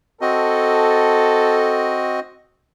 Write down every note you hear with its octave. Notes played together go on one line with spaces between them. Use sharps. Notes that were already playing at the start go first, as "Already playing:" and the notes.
C4 F#4 A4 D#5